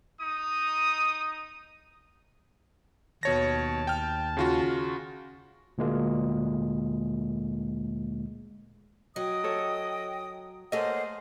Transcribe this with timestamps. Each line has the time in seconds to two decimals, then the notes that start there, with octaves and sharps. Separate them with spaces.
0.20 D#4 D#6
3.23 D#2 B2 C#5 A5 A#6
3.87 G5 F6
4.37 C#3 F4 F#4
5.78 D2 A#2 G#3 A#3
9.16 F#3 D#5 G5 D#6
9.44 A4 C#5
10.72 A3 A#3 G#4 A4 C5 C#5 D#5 F#5